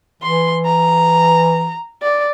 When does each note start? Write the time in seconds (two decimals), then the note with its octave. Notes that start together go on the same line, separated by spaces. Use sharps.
0.23 E3 C6
0.66 A#5
2.02 D5